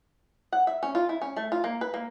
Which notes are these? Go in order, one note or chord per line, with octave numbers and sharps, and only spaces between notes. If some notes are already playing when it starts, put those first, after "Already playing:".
F#5
E5
C#4
F4
E4
C#4
A3
F4
A#3
B4
A#3